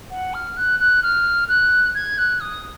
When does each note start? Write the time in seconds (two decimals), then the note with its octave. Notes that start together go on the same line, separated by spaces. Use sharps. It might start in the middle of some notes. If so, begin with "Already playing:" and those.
0.10 F#5
0.34 F6
0.57 F#6
0.80 F#6
1.03 F6
1.49 F#6
1.95 G#6
2.18 F#6
2.41 D#6